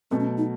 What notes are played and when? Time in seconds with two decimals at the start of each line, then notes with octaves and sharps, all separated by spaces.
0.11 B2 F#3 A3 C4
0.20 C#4
0.38 D#4